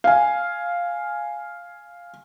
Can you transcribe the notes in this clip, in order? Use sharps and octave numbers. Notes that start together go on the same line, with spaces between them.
F5 G#5